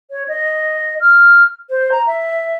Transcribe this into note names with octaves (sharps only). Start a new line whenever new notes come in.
C#5
D#5
F6
C5
A#5
E5